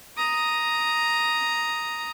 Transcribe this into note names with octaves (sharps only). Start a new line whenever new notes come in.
A#5 D#6